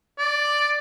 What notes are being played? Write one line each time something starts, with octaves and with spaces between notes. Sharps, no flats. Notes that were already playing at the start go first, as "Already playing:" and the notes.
D5